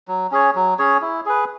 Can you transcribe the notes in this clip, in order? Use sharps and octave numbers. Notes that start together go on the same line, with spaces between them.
F#3
C#4 G#4 C#5
F#3
C#4 G#4 C#5
E4
G#4 B4